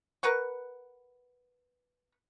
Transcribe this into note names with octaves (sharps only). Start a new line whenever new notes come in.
A#4 B4 F#5 C#6